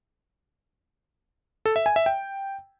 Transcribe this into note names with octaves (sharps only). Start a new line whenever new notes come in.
A4
E5
G#5
E5
G5